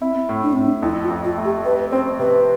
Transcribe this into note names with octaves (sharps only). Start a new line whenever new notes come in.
C4 E4
A2
D4
A2 C4
D4
F2 E4
F4
F2
F4
A3
G4
G3 B4
C4 C5
C3 B4